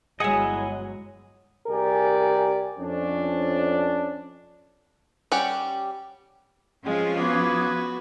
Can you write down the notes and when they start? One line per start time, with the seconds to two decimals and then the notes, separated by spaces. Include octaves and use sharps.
0.20 G1 F#3 G#3 E4 G#4 D#5 F#5 G#5
1.67 C2 G4 G#4 A#4 D5 G#5
2.79 F2 C#4 D4
5.32 G3 C#4 G4 F#5
6.86 F3 G#3 C#4 F4
7.18 B3 F#4 B4 D6 D#6 G#6